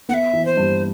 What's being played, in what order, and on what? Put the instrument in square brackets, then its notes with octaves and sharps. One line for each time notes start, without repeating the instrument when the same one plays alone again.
[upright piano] B3 [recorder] F#5
[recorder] E5
[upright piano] E3
[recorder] C5
[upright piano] G2